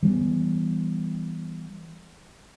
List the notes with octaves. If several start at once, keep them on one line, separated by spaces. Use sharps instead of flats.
E3 G3 G#3 B3